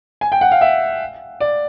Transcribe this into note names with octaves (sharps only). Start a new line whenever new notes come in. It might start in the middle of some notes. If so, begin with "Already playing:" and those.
G#5
G5
F#5
F5
E5
D5